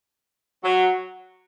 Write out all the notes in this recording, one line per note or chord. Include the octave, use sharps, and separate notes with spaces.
F#3